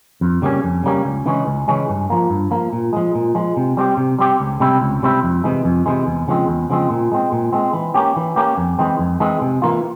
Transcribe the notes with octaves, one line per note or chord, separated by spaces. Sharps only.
F2
C#3 G3 A#3 C#4
F2
C#3 G3 A#3 C#4
C#2
C#3 E3 G#3 C#4
C#2
C#3 E3 G#3 C#4
G2
F3 A#3
G2
F3 A#3
A#2
F3 G#3
A#2
F3 G#3
C3
G3 C4 G4
C3
G3 C4 G4
C#2
C3 G3 C4 E4
C#2
C3 G3 C4 E4
F2
C3 E3 G#3
F2
C3 E3 G#3
E2
C#3 F3 G#3 C4
E2
C#3 F3 G#3 C4
A#2
G#3 C4
A#2
G#3 C4
E3
A#3 C#4 G4
E3
A#3 C#4 G4
F2
E3 G#3 C4
F2
E3 G#3 C4
C3
E3 A#3 F4